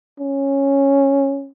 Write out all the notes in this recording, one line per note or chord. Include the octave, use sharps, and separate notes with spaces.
C#4